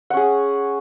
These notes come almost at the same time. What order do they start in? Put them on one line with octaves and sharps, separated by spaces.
F#5 C#4 G#4